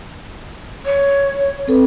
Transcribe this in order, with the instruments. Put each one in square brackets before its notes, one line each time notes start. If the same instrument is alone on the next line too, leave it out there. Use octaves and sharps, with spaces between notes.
[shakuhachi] C#5
[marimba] C4 A4 B4